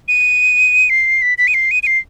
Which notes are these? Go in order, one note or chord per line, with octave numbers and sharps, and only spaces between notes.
D#7
C7
B6
B6
D#7
C7
D#7
D#7
C7